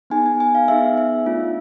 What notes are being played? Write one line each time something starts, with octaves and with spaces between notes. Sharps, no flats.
B3 D#4 G#4 G#5
G#5
G#5
F5
B3 D#4 G#4 E5
E5
A3 D4 F4